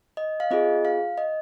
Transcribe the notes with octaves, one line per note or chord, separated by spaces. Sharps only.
D#5
F5
C4 F4 G#4 D#5
F5
D#5